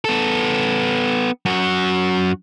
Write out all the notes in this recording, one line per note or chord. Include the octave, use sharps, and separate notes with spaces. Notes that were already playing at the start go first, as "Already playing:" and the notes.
B3 A4
F#2 F#4